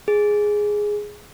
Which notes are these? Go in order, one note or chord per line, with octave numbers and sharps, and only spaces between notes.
G#4